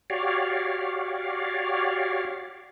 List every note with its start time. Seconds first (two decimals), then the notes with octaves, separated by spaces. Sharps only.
0.10 F#4 G4 C#5 D5 F5